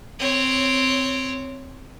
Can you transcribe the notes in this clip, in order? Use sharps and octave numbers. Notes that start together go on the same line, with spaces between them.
C4 C#5